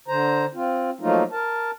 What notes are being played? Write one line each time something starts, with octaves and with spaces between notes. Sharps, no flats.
D3 C5 A#5
C4 F4
F3 F#3 A3 A#3 D#4 F4
A#4 A5